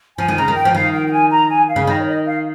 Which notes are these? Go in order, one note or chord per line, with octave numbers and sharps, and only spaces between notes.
F3 G#5
D#3
C#3 A#5
D#3
G5
F3
D#3 F5
G5
G5
G#5
A#5
G#5
F5
C#3
D#3 D#5
C#5
D#5
F5